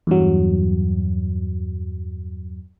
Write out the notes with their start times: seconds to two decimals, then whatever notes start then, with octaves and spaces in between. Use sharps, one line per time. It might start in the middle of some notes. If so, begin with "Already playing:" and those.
0.07 E2 G2 F#3